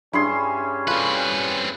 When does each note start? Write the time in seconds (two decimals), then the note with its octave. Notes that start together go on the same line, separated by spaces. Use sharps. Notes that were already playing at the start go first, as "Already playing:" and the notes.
0.13 G2 G3 C#4 E4 G#4 C6
0.87 C4 F4 A4 B4